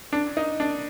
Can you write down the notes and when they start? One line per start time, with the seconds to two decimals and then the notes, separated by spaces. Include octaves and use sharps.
0.13 D4
0.37 D#4
0.60 D4